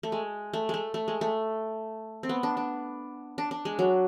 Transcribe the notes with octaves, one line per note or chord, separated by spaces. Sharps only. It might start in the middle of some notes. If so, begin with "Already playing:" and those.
A3
G#3
A3
G#3 A3
A3
G#3
A3
C4
B3
D4
D4
D4
D4
G#3
F#3